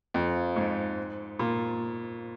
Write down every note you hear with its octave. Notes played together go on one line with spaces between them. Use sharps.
F2
G#2
A#2